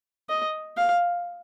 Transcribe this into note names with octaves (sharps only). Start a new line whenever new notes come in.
D#5
F5